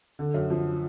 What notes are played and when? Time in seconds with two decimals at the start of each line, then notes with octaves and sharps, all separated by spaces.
0.19 D3
0.34 F#2
0.50 F3